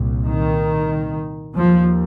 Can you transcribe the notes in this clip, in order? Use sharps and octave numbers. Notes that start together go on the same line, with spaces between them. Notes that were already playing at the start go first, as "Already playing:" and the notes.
Already playing: C2 A#2
D#3
D#2 F3